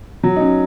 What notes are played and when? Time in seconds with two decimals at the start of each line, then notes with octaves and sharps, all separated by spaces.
0.23 F#3
0.36 D#4
0.40 C#4